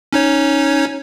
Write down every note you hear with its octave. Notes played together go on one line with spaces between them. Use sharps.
C#4 D#4 C#5